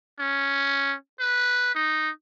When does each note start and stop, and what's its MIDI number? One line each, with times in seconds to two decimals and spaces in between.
0.20 0.94 61
1.20 1.71 71
1.75 2.10 63